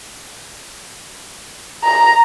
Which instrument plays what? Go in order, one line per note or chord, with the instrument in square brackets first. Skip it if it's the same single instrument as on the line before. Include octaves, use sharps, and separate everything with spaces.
[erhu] A#5